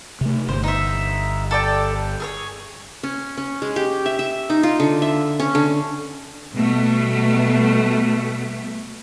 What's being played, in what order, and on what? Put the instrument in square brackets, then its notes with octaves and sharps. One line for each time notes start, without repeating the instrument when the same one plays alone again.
[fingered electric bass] C3 A3
[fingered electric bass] G1 [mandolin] C5
[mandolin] D#4 E5
A4 D5 G5
G#4 A4 C#5
[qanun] C#4
C#4
G#3
G4
E5
E5
D#4
F4
D3
E5
C#4
D3
[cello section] B2 G3 A3